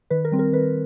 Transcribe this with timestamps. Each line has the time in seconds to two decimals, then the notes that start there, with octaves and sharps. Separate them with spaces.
0.10 D#3 B4
0.25 A#4
0.32 G3 C4
0.39 A#4
0.53 D#3 B4